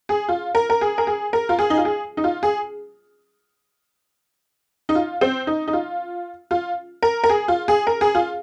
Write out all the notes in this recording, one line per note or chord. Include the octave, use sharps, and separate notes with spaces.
G#4
F4
A#4
A#4
G#4
A#4
G#4
A#4
F4
G#4
D#4
F4
G#4
D#4
F4
G#4
D#4
F4
C4
D#4
D#4
F4
F4
A#4
A#4
G#4
F4
G#4
A#4
G#4
F4